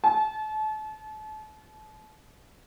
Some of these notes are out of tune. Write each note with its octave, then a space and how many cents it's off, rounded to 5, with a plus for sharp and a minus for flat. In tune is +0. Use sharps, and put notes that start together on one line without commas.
A5 -30